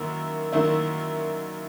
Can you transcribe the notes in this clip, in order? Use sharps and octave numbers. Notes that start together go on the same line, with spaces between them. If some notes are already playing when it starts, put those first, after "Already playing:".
Already playing: F#2 D#3 A#3 E4
F#2 D#3 A#3 E4